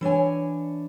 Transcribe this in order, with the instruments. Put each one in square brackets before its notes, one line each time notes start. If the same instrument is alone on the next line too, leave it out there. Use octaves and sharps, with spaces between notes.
[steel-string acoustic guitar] E3 D4 C#5 G#5